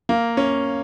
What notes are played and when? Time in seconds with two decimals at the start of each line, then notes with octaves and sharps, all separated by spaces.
0.09 A#3
0.37 C#4